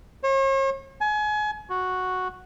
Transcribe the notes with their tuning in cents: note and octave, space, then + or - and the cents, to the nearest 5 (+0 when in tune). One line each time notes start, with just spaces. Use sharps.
C#5 -45
G#5 +30
F#4 -5